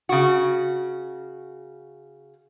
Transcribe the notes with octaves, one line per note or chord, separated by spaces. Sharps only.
C#3 F#4